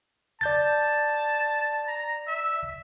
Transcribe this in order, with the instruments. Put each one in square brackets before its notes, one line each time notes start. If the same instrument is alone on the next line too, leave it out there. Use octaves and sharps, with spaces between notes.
[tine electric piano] D5 G6 A6 [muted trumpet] A5
[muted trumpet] A#5
E5